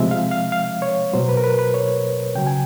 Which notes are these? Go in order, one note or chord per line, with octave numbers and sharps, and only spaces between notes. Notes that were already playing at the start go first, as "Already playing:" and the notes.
Already playing: C3 F3 G#3 E5
F5
F5
F5
C#5
B2 F#3 C5
B4
A#4
B4
B4
C#5
C#3 F#3 G5
G#5